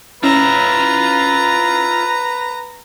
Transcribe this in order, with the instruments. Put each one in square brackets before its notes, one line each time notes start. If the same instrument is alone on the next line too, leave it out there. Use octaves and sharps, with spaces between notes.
[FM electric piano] C#4 E4 C7 [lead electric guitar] F4 E5 [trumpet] B4 [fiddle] A#5